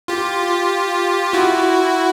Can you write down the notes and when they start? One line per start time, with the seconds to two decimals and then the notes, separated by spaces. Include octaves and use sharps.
0.08 F4 G4
1.33 E4 F#4